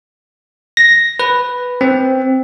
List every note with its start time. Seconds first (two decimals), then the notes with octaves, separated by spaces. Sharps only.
0.77 A#6
1.19 B4
1.81 C4